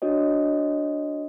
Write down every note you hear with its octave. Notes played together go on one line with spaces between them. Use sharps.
D4 F#4 C#5 D#5